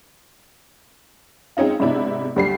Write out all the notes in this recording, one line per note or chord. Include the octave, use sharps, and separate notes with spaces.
G#3 C4 C#4 D#4 F4
G#2 C3 B3 D4 E4
D2 G3 C7